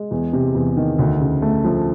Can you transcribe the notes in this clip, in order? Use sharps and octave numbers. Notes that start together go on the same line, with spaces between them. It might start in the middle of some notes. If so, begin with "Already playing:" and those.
Already playing: G#3
E2
C3
E2
D#3
D2
C#3
A3
F3